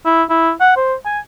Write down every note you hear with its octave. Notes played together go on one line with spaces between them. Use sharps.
E4
E4
F#5
C5
G#5